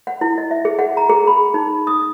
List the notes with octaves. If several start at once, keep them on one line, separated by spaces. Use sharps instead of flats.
F#5
E4
D#5
E5
G#4
F#5
A#5
G#4
B5
D#4
D#6